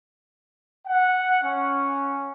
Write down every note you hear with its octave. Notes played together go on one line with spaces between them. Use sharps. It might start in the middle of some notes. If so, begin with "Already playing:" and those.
F#5
C#4